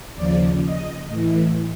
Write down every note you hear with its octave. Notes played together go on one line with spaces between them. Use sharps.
D#2 C#3 F3 D5
D#5
A2 E3